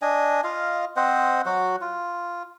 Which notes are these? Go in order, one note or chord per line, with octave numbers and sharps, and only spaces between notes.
D4 D#5 G#5
F4 D#5 F5
C4 C5 D#5 F#5
F#3 F#4 F#5
F4